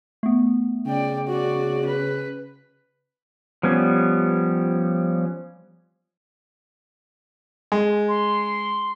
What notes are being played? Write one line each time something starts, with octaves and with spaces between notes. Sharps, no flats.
A3 B3
C#3 D5 G5
F#4 D5
B4
F3 G3 B3 C#4
G#3
C6